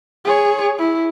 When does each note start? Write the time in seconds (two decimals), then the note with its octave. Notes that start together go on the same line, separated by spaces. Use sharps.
0.25 G#4 C#5
0.78 E4